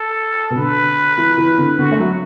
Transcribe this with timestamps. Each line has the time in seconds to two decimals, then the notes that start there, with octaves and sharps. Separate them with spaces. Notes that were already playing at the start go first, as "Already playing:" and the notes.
Already playing: A4
0.50 B2
0.56 D3 B4
1.18 E3
1.38 E3
1.58 D3
1.79 D3 F#4
1.92 A3
1.99 F#3